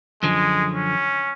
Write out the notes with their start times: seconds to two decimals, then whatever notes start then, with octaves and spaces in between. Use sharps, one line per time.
0.23 F#2 D3 F3 G#3
0.74 C#4